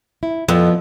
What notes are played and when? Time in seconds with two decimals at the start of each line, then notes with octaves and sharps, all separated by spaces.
0.23 E4
0.48 F2 F3 B3